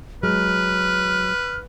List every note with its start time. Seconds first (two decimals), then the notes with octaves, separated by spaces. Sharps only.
0.23 F#3 G#3 B4 F6